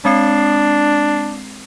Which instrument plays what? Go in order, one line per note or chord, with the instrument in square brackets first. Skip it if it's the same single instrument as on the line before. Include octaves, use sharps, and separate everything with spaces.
[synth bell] G#3 C4 C7 [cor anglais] D4